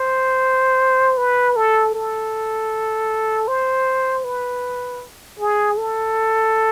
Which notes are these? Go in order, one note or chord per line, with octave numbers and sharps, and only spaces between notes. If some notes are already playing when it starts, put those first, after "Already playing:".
Already playing: C5
B4
A4
A4
C5
B4
G#4
A4